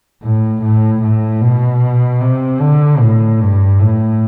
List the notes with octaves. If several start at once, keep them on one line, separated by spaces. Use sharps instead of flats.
A2
A2
A2
B2
C3
D3
A2
G2
A2